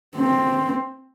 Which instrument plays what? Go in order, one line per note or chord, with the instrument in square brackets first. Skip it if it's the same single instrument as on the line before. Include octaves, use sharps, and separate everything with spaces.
[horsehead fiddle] C4